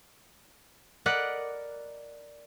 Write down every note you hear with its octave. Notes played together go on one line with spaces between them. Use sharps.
A#4 D5 D#5 F#5 B5